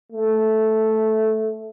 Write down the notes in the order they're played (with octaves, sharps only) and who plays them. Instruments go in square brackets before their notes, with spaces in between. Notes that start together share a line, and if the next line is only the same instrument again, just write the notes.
[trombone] A3